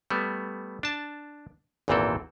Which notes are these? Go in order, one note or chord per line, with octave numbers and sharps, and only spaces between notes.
G3 A3 B3
D4 A5
G#1 E2 A#2 E3 C4 A4